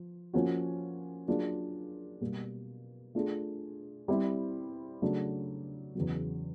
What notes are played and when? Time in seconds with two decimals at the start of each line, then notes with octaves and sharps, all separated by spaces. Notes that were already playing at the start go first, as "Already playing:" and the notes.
Already playing: F3
0.34 F3 A#3 C#4 F#4
1.28 F#3 A#3 D4 F4 G#4
2.21 B2 G3 A#3
3.15 A3 D4 F4 G#4
4.08 G3 C4 E4
5.02 C#3 F#3 A3 D4
5.95 E2 C#3 F#3